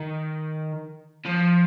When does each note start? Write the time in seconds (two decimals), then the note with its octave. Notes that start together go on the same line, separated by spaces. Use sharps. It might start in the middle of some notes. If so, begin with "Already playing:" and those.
Already playing: D#3
1.25 F3